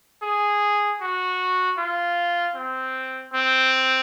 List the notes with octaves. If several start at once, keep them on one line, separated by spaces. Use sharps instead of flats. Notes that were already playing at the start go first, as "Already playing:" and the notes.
G#4
F#4
F4
C4
C4